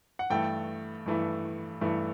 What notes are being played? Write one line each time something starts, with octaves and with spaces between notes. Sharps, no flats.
F#5
G2 E3 A3 G5
G2 E3 A3
G2 E3 A3